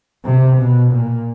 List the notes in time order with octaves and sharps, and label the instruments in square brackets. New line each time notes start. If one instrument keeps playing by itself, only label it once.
[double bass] C3
B2
A#2